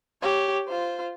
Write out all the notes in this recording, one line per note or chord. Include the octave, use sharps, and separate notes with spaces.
G4 C#5
F4 C5